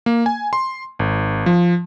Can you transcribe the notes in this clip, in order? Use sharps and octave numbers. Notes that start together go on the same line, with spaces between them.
A#3
G#5
C6
G#1
F3